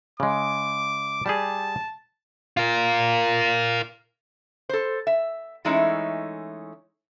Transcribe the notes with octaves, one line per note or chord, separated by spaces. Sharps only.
C#3 G#3 D6
G3 G4 G#4 A5
F4 A#4
A4 C5
E5
E3 G#3 A3 C#4 D#4 E4